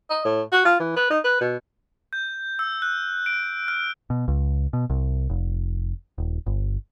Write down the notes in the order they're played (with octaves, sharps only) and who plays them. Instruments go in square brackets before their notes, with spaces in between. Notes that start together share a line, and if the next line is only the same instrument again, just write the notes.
[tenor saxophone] D#5
A2
F#4
F4
E3
B4
D#4
B4
B2
[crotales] G6
E6
F#6
D7
F6
[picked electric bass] B2
C#2
B2
C2
F1
D#1
G1